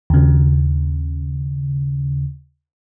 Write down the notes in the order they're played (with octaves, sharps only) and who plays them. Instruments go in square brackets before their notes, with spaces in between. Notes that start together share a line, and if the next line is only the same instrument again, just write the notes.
[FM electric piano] D#2 C#3